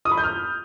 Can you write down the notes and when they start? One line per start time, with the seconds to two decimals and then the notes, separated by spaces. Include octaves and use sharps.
0.05 D#6
0.11 B5
0.18 G6
0.24 F6